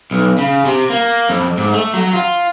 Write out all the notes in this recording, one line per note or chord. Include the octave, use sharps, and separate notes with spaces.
B1
C#3
C3
A#3
F2
G#2
A3
F#3
F4